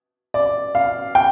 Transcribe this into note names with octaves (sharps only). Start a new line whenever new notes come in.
D5
F5
G5